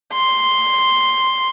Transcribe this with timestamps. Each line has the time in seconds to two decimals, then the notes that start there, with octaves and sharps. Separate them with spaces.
0.13 C6